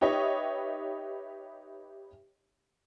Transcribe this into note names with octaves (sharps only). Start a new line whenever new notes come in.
D#4 G4 B4 C#5 D#5 E5